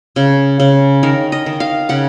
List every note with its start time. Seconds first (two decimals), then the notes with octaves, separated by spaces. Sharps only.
0.16 C#3
0.60 C#3
1.03 D#3 A#4
1.32 D#5
1.46 D#3
1.60 F5
1.89 C#3 F#5